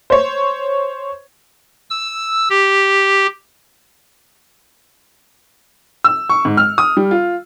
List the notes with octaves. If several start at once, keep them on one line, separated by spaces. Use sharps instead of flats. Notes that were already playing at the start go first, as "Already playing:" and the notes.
C5 C#5
E6
G4
E6
C#6
G#2
F6
D#6
G3
F4